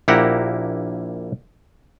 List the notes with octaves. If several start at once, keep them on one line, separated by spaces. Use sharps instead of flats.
A#1 A#3 E4 G4 F#5 A#5